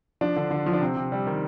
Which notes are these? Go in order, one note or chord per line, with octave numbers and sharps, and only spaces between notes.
F3 D4
D3
D3
F3
D4
C3 C4
C3
G3
D#3